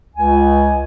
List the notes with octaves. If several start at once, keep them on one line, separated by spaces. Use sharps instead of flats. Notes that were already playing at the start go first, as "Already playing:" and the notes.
C#2 G#5